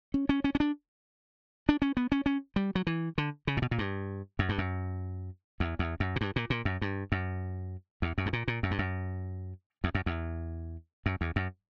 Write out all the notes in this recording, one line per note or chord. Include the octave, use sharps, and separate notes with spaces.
C#4
C#4
C#4
C#4
D4
D4
C#4
B3
C#4
C#4
G3
F#3
E3
D3
C#3
A#2
B2
A#2
G2
F#2
G2
F#2
E2
E2
F#2
A#2
G2
A#2
A#2
F#2
G2
F#2
E2
F#2
G2
A#2
A#2
F#2
G2
F#2
E2
F#2
E2
F#2
E2
F#2